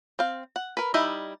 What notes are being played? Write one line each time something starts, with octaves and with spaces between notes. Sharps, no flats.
C4 F5
F#5
A#4 B4
G3 D#4 E4 D#5 E5